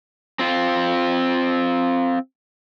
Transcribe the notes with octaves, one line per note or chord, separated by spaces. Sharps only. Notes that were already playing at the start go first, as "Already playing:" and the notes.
C4 F4